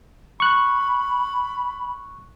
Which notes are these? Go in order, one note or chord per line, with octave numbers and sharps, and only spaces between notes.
B5 C#6 F#6